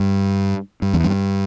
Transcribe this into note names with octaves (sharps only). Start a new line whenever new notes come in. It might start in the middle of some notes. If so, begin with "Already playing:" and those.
Already playing: G2
G2
E2
G2